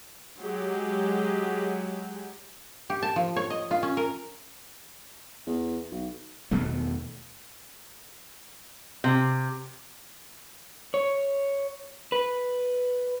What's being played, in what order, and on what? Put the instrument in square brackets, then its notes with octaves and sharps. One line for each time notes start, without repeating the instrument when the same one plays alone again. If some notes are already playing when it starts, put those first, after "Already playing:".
[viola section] F#3 G#3 G4
[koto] G4
A5
F3
C#5
D#5
F4
C#4
A#4
[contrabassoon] E2
B1
[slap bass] E2 B2 D#3 A3
[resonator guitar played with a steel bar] C3
[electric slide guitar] C#5
B4